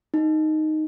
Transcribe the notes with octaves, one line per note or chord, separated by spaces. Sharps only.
D#4